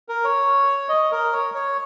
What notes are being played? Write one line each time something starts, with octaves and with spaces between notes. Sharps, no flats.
A#4
C#5
D#5
A#4
C#5
C#5